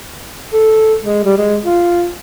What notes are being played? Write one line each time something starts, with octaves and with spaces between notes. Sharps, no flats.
A4
G#3
G3
G#3
F4